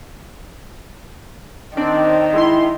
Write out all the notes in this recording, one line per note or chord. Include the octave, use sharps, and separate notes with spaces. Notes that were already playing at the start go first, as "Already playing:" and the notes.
D#3 C4 D4 D5
G#3 E4 C6